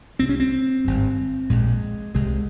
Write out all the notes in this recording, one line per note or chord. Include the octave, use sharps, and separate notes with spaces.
C2 C3 C4
C#4
C4
G#1 G2
A#1 A#2 G#3
C2 C3 G#3